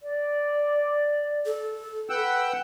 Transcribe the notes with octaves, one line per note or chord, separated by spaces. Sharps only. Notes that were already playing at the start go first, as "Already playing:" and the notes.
D5
A4
B4 F#5 G5 E6